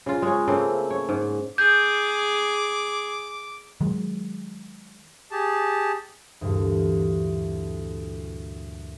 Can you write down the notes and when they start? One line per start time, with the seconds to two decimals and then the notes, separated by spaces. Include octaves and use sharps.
0.06 C#3 F4
0.22 G#3 C#5
0.47 C#3 A3 A#3 C4
0.90 C#5
1.09 G#2
1.58 G#4 D6 G6
3.81 D#3 F#3 G#3
5.31 G4 G#4 A5
6.41 D2 G2 A#2 E3